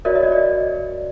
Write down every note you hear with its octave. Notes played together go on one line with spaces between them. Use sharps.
F#4 A#4 C#5 D5 E5
E5
D#5
D5